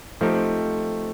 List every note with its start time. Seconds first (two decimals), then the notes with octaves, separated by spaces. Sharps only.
0.21 F3 A3 C4 D#4 G4